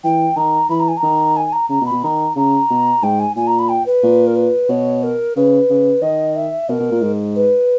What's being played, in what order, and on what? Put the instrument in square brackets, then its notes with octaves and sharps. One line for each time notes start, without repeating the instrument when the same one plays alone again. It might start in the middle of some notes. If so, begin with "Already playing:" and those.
[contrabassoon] E3 [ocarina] G5
[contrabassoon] D#3 [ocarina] A#5
[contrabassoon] E3 [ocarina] B5
[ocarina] A#5
G#5
A#5
[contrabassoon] D#3
[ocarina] G#5
A#5
[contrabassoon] C#3 [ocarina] A#5
[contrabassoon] B2
[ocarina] B5
[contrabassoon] B2
[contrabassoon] D#3 [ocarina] A#5
[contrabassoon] C#3 [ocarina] A#5
[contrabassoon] B2
[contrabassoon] G#2 [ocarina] G5
[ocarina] G#5
[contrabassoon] A#2 [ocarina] G#5
[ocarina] A#5
B5
G5
B4
[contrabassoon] A#2
[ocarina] A#4
B4
[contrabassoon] B2 [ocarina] C#5
[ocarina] A#4
[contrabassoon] C#3 [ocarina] B4
[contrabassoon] C#3
[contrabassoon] D#3 [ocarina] D#5
[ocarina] E5
[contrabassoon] B2 [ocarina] A#4
[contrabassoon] B2
A#2
G#2
[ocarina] B4